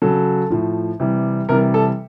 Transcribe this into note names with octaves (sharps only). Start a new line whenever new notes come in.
C#3 F#3 A4
A2 F3
C3 E3 G3
C3 E3 G3 A#4
A4